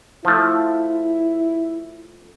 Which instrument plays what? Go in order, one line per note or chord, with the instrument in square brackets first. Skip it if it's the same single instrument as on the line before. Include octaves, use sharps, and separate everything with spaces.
[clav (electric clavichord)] F3 A3 [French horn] E4